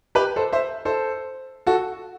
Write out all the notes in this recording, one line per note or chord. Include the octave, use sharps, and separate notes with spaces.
G4 B4
A4 C5
C5 E5
A4 C5
F#4 A4